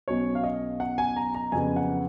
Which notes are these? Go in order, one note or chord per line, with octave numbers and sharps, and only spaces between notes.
B1 B2 F#3 C#4 C#5
F5
D#5
F#5
G#5
A#5
A#5
F2 C#3 F#3 B3 G#5
F#5